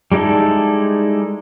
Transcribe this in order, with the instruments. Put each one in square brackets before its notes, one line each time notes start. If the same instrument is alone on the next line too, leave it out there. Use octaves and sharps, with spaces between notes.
[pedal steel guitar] G3 G#3 D#4 E4 A4